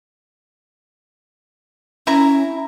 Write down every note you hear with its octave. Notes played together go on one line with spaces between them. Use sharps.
C#4 E4 A#5